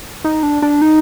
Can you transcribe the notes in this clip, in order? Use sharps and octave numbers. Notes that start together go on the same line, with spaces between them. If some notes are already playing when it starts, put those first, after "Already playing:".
D#4
D4
D4
D#4